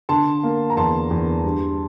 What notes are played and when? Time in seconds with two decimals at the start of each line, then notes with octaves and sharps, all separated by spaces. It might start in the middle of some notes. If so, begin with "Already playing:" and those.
0.09 D3 A5 C6
0.43 A#3
0.70 A#5
0.77 E2 A5 C6
1.11 E2
1.44 G2